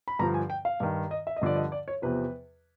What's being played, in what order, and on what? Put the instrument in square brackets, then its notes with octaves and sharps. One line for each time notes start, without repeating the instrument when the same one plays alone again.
[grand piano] B5
G2 D3 F3 A#5
G#5
G5
F5
G2 D#3
D#5
E5
D#5
G2 D3 F3 D5
D#5
D5
C#5
E2 C3 F3 B4